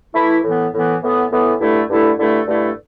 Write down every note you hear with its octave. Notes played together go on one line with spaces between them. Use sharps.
E3 A3 E4
A2 E3 B3
A2 E3 B3
A2 E3 B3
A2 E3 B3
G2 D3 A3 E4 A4
G2 D3 A3 E4 A4
G2 D3 A3 E4 A4
G2 D3 A3 E4 A4